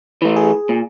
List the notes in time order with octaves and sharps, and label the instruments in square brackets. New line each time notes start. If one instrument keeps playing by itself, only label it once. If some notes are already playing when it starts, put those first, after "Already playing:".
[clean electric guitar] E3 A3
[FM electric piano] G#4
[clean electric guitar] A#2